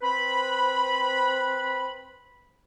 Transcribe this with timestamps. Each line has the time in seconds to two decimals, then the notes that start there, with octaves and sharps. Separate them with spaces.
0.01 C4 B4 B5